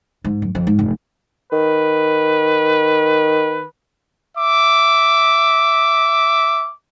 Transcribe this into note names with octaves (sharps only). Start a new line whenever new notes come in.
G#2
F#2
F2
G#2
F1
D#3 B4
E5 D6